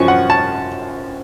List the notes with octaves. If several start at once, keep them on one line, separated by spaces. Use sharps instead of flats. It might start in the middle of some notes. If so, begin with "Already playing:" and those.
Already playing: F#2 F3 C#4 C#6
F#5
A5